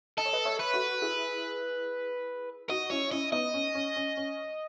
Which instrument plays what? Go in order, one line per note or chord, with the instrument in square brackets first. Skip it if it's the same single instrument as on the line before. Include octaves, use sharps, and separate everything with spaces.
[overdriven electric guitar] A4 [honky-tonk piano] D#5
[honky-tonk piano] C#5
B4 D#5
C#5 E5
[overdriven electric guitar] B4
[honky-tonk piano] F#4 A4
E4 G#4
[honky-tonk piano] D#4 F#4 [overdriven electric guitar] D#5
[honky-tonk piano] C#4 E4 [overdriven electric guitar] C#5
[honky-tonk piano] C#4 E4 [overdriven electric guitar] D#5
[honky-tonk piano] B3 D#4 [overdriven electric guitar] D#5
[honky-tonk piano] C#4
C#4
C#4
C#4